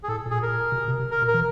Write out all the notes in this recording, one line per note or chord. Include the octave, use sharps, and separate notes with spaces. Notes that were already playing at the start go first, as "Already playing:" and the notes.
G#4
A2 A4
A#2
G#4
A#4
C3
B2
C3
C3
A#4
B2
A#4
E3